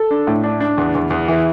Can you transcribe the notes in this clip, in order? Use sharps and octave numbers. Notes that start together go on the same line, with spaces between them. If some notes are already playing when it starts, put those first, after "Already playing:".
Already playing: A4
D4
A2
D4
D4
E2
E2
E2
E3